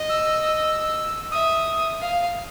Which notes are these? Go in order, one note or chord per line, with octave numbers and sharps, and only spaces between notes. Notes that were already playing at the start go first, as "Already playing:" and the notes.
Already playing: D#5
E6
E5 D#6
F5